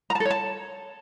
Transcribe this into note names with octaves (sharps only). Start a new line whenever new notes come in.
A#5
A5
A4
C#5
A5